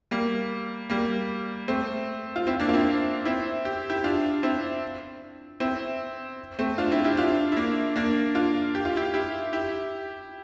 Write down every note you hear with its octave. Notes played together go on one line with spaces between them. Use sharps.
G3 A#3
G3 A#3
A3 C4
F4
C4 E4
A#3 D4
F4
C4 E4
C4 E4
G4
E4 G4
D4 F4
C4 E4
C4 E4
A3 C4
D4 F4
C4 E4
E4 G4
D4 F4
E4
A#3 D4
A#3 D4
D4 F4
G4
F4
E4 G4
E4 G4
E4 G4